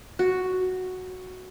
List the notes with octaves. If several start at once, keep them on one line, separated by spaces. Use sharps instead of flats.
F#4